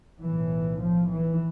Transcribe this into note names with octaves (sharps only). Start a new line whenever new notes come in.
B1 A2 E3
F3
E3